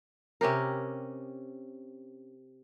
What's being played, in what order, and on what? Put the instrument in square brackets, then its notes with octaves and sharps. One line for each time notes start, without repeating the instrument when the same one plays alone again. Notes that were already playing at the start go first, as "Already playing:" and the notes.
[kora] C3 C#4 G4 A#4